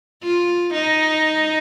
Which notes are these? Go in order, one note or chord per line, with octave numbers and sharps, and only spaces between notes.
F4
D#4